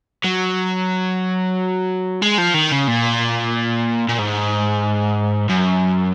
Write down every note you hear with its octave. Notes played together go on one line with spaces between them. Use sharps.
F#3
G#3
F3
D#3
C#3
A#2
A#2
G#2
F#2